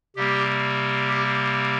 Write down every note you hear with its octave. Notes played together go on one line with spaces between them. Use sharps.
C3 G3 A#3 G4
G4